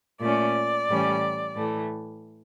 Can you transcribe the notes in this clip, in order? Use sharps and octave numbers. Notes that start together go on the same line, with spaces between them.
A#2 A3 C#4 D5
A2 E3 G3 C#4
A2 E3 A3